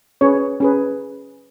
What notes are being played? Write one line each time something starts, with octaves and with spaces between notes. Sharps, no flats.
C#4 G#4 B4 C#5
C#4 G#4 B4